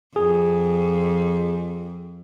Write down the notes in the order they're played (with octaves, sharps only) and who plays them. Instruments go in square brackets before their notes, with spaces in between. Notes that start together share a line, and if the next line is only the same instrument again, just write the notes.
[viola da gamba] F2 [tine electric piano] G#4